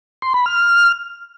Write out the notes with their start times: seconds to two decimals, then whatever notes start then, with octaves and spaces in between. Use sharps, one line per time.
0.22 C6
0.34 B5
0.46 F6